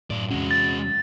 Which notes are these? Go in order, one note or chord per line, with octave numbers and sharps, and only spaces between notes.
F#2 A2 D5
E2 C3 G#3 C#4 F#4
A6